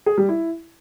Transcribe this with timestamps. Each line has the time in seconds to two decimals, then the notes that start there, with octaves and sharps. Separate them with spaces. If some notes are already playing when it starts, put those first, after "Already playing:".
0.06 G#4
0.18 G3
0.29 E4